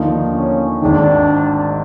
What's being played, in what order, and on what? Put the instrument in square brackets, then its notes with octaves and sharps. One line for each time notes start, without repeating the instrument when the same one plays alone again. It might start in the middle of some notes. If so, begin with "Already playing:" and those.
Already playing: [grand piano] D#2 D3 F3 A#3 D#4
[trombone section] C#4
[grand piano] G#1 G#2 D#3 [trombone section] D4